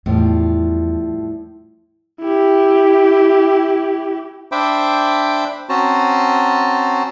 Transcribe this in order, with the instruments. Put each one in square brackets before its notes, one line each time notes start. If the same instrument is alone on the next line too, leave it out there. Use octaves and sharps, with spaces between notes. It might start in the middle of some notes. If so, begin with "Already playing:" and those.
[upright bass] E2 [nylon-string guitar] A2 F3 G3
[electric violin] E4 G4
[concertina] D4 C5 E5 G5 B5 D6
C4 C#4 F#4 C5 A5 A#5